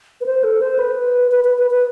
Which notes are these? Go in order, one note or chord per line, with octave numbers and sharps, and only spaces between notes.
B4
C5
A4
C5
B4
B4
B4
B4
B4